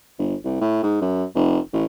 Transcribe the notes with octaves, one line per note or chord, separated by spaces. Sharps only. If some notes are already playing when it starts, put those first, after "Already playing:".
G1
C2
A2
G#2
F#2
F1
A1